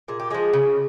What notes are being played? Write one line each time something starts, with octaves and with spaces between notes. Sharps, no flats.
A#2 G#4
G4
F3 G#3 G#4
C#3